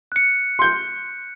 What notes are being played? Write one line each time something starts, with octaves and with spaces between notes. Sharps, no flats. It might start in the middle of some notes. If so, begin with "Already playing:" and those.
F#6 C#7
C6 G6